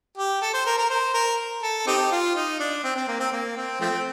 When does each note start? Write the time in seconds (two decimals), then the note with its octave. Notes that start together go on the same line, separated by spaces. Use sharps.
0.17 G4
0.42 A4
0.54 C5
0.66 A#4
0.78 A#4
0.90 C5
1.14 A#4
1.62 A4
1.87 C4 D#4 G4
2.11 F4
2.35 D#4
2.60 D4
2.84 C4
2.96 C4
3.08 A#3
3.20 C4
3.32 A#3
3.57 C4
3.81 F3 A3 C4